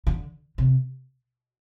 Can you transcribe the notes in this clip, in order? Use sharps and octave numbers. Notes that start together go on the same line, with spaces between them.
D3
C3